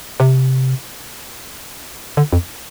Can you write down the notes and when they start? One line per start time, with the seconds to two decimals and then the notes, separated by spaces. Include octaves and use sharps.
0.20 C3
2.17 D3
2.33 F2